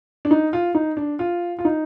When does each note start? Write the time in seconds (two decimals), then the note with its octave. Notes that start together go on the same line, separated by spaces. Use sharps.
0.25 D4
0.31 D#4
0.53 F4
0.75 D#4
0.97 D4
1.19 F4
1.59 F4
1.65 D#4